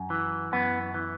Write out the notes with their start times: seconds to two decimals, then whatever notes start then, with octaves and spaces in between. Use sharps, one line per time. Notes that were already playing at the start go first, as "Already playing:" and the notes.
Already playing: F#2
0.10 E3
0.52 F#2 B3
0.94 E3